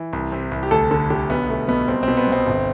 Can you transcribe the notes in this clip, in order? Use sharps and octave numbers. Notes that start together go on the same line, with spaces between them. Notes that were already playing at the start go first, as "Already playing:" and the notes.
Already playing: E3
C2
C3
C2
G4
D2 A4
D3 A4
D3 G4
B1 B3
B2 A3
B2 B3
C2 C4
B2 C4
B3
B2 C4
G1